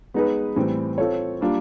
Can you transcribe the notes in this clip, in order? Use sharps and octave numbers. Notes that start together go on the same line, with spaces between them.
G#3 B3 D#4 G#4 B4
A2 E3 G3 C4
C4 F4 A4 C#5
G3 A#3 D4 F4